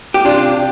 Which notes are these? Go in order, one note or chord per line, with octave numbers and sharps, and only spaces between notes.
G4
C3 D4 F4